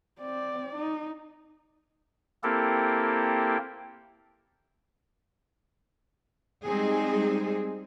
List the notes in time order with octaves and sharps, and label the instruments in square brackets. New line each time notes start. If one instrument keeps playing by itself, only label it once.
[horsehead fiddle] C4 D5
D#4
[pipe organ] A#3 C4 E4 G4 A4 A#4
[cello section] G3 G#3 C4 D#4 G#4